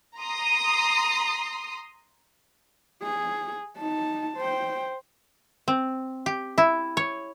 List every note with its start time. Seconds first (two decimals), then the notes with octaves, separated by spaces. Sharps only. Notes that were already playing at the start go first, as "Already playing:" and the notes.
0.19 A#5 C6 D#6
3.03 G#4
3.78 D#4 A5
4.37 C5 G5
5.68 C4
6.26 G4
6.58 E4
6.97 C#5